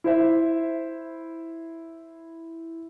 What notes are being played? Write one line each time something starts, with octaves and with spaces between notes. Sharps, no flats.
E4 C5 E5